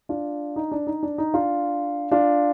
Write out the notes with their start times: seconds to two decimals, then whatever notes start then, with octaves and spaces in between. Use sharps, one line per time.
0.09 D4 F4
0.56 D#4
0.72 D4
0.87 D#4
1.03 D4
1.18 D#4
1.34 D4 F4
2.11 D4 F4